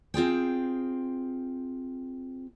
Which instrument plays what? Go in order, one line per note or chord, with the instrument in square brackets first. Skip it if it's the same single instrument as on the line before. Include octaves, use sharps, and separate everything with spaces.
[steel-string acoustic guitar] C4 F4 G#4 G5